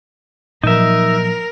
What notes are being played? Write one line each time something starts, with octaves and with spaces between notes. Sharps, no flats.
A#2 F3 F#3 D#4 A#4 E5